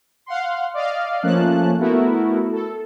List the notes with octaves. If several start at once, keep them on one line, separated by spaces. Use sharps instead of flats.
F5 F#5 C6
D5 D#5 F5
F3 A3 A#3 C#4 A5 F#6
A3 B3 E4 F#4 A#4
A4